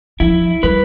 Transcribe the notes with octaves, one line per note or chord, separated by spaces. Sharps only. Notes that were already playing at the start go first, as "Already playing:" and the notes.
F3 E4
G3 B4